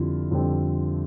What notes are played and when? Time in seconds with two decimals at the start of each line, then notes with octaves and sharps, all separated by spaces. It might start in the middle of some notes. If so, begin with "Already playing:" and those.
Already playing: F2 D3 G3 C4 E4 F4
0.31 F2 D3 G3 C4